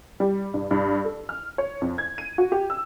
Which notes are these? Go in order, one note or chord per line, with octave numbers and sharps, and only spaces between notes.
G3
G2
G2
A4
F6
C#5
F2
G#6
D#7
F#4
G4
E6